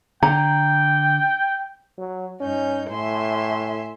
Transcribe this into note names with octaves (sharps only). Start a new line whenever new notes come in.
D3 G5 A#5
F#3
G2 C#4 D#4 G6
A2 E5 G#5 C6